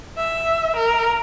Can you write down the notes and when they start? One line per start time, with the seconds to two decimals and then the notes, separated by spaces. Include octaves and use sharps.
0.17 E5
0.76 A#4